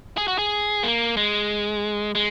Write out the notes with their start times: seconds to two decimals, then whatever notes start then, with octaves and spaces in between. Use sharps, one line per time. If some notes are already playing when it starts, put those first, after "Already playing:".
0.17 G#4
0.28 F#4
0.38 G#4
0.83 A#3
1.17 G#3
2.15 G#3